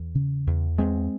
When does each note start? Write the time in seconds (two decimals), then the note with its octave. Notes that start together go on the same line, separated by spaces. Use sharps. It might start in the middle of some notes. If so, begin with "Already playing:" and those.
Already playing: E2
0.15 C#3
0.47 E2
0.78 E2 G#3 C4